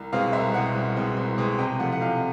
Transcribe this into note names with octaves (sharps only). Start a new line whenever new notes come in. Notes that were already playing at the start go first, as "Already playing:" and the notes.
Already playing: C2
B2 G#3 C4 F5
C2 E5
B2 G#3 C4 F#5
C2
B2 G#3 C4
C2
B2 G#3 C4
C3 G5
F3 A3 F#5
F#5
C3 F5